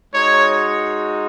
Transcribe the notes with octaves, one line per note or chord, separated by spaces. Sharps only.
G#3 D#4 F#4 C#5